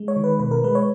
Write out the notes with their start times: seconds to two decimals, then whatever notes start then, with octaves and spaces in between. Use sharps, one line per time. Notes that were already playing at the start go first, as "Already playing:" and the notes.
Already playing: G#3
0.08 C#5
0.16 D#3
0.24 B4
0.40 B2 B4
0.51 A#4
0.64 G#3 B4
0.75 C#5